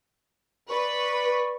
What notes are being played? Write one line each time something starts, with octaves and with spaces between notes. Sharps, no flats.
B4 D5 C#6